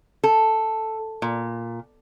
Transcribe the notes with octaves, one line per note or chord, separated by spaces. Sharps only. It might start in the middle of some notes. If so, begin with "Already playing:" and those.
A4
A#2